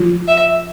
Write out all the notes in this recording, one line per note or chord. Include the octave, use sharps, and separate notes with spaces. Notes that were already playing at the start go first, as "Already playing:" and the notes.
Already playing: F3 F4
E5